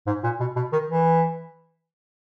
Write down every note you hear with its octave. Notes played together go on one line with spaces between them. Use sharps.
G#2
A#2
B2
B2
D#3
E3